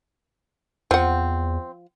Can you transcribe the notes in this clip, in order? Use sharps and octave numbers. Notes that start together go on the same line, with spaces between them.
E2 F3 C4 F#5